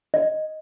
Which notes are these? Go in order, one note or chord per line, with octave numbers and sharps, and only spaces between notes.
D#5